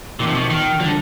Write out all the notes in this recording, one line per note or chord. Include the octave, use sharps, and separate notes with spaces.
A#2 D#3 F3
C3
B2
D#3
D3 F3 G3